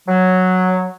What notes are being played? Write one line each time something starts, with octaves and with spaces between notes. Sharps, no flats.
F#3